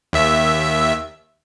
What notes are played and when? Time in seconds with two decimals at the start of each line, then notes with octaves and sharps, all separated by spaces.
0.13 D#2 E5